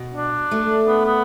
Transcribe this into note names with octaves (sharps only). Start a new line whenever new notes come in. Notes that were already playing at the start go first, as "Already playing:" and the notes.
Already playing: B2
D4
A3
B3
B3